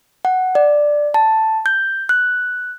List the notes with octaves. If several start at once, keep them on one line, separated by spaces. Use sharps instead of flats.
F#5
D5
A5
G6
F#6